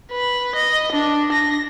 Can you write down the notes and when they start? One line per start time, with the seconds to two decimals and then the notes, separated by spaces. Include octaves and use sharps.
0.12 B4
0.56 D#5
0.93 D4
1.33 A#6